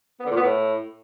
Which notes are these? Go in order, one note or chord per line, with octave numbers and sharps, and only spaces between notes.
B3
D3
A#2
B3
A2